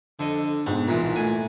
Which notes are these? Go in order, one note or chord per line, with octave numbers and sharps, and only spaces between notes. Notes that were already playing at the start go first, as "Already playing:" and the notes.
F2 D3 D#5
G#2 B2 C4
C2 A#2 E3
A2 G#5